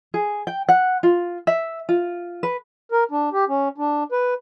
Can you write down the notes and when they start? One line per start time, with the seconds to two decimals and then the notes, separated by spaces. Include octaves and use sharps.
0.14 G#4
0.47 G5
0.69 F#5
1.03 F4
1.47 E5
1.89 F4
2.43 B4
2.92 A#4
3.11 D4
3.33 G4
3.48 C#4
3.78 D4
4.12 B4